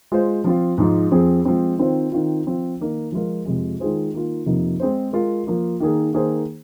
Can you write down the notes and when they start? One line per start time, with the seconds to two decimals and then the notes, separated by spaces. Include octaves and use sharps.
0.12 G#3 F4 C5
0.44 F3 C4 F4
0.78 G#2 F3 G#3
1.12 F2 F3 C4 G#4
1.45 F3 G#3 C4
1.79 D#3 C4 F4 C5
2.12 D#3 C4 F4
2.46 F3 C4 F4
2.80 D#3 A#3 D#4
3.12 F3 G#3 F4 A#4
3.46 F2 C3 F3 G#3
3.80 D#3 G#3 F4 G#4 C5
4.13 D#3 A#3 F4
4.46 F2 C3 F3 A#3 D#4
4.80 G#3 C4 G#4 C5
5.13 G#3 F4 A#4
5.47 F3 A#3 F4
5.80 D#3 A#3 G#4
6.14 D#3 A#3 G#4 C5